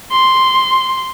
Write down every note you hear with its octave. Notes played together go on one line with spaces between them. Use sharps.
C6